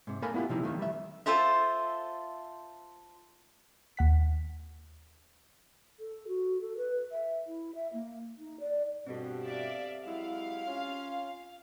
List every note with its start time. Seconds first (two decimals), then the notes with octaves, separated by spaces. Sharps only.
0.07 G#2 C3
0.22 A#3 A4 A#4 G#5 B5
0.34 B3 E4 F4 G4 F#5
0.49 C3 F3 D#4 E4
0.63 F2 A#2 D#3 A3
0.79 G3 E5
1.26 F4 A4 C5 E5
3.97 D#2 F#5 B6
6.00 A4
6.27 F#4
6.61 A4
6.77 B4
7.11 E5
7.47 E4
7.75 E5
7.93 A#3
8.38 D#4
8.60 D5
9.07 G2 B2 C4 G4 A4
9.41 D5 E5 F5
10.06 F#3 G#3 E4 F5
10.67 C#4 F4